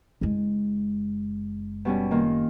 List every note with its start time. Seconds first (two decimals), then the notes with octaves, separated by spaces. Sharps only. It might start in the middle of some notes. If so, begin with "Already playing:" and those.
0.21 F#1 G#3
1.85 B2 G3 C#4
2.11 D#3 A#3 F4